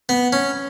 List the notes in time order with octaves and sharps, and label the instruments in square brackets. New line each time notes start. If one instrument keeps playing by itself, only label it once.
[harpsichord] B3
C#4